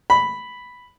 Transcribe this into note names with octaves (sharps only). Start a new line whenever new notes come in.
B5